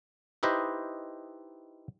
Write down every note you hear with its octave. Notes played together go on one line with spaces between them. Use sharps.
D#4 E4 G4 B4 C5 D#5